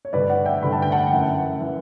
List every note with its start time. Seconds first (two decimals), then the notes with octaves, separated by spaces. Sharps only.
0.05 C#5
0.13 G2 D3 B4 D5
0.30 D5 F#5
0.46 E5 G5
0.63 G2 D3 B5
0.72 A5
0.82 G5
0.92 F#5 A5
1.12 F#2 E3
1.61 E3